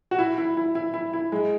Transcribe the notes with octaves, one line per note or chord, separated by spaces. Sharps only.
F#4
E4
E4
E4
E4
E4
E4
G#3